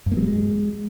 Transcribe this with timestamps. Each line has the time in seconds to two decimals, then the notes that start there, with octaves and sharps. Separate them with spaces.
0.06 G2
0.12 A#3
0.17 F#3
0.22 G3
0.28 G#3